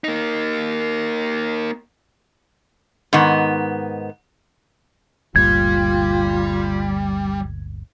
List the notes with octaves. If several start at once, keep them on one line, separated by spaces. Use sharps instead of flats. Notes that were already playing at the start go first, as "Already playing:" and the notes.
A#3 D#4
G#2 D#3 B3
G1 D2 A#2 G3 F4 G#6